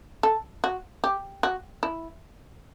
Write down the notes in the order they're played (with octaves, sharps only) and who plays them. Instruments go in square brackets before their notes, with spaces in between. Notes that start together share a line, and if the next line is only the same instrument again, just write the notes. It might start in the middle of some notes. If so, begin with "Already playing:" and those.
[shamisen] A4
F#4
G4
F#4
E4